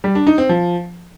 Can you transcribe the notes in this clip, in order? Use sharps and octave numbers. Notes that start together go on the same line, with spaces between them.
G3
D4
D#4
C4
F3